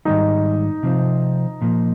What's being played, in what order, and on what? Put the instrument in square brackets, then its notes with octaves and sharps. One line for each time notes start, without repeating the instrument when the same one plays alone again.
[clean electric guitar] G#2 D#3 G3 [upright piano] D#4
[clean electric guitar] C3 F3 C4 F4
A#2 F3 A#3